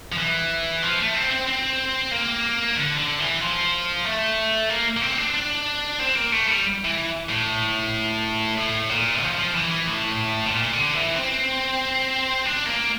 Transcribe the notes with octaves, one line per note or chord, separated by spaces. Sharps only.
F3
E3
F3
A3
C4
C4
C4
A#3
D3
D3
E3
F3
A3
A#3
A#3
C4
D4
D4
C4
A#3
A3
G3
E3
A2
A2
A#2
F3
F3
E3
E3
A2
C3
A#2
D3
E3
C4
D4
A#3